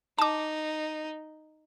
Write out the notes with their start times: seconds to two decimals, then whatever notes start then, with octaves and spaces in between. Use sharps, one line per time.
0.19 D#4 A5 D6